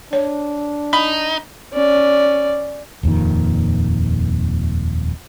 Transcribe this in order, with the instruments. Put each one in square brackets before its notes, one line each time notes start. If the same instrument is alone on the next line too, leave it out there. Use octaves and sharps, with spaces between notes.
[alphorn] D4 [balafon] C#5
[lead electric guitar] D#4 [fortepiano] B5
[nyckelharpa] C#4 D5
[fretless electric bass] D#1 F2 A#2 D#3